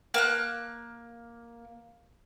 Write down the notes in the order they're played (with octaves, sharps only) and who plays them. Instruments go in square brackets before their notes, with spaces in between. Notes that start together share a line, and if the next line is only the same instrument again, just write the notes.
[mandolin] A#3 F6 F#6